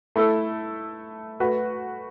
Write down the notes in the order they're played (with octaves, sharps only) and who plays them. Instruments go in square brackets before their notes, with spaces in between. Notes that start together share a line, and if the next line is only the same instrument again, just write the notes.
[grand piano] A3 E4 A4
A3 F#4 B4